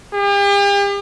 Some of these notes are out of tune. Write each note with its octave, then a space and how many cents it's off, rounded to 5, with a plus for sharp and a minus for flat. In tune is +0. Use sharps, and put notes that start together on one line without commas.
G4 +45